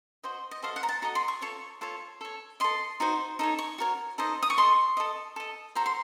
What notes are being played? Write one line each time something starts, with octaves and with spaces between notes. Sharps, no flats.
F#4 C5 D#5
D#5
F#4 A4 C5 D#5 F5
F#5
A#5
A5
F#4 A4 D#5 A#5
C6
C#6
F4 A4 C#5 C#6
F4 A4 C#5
A4 C#5
A4 D#5 C6
D#4 F#4 C5
D#4 A4 C#5
C#6
F#4 A#4 C#5
D#4 A4 C5 D#5
D#6
C#6
A4 D#5 C6
A4 D#5
A4 D#5
F#4 A4 C5 A#5
C6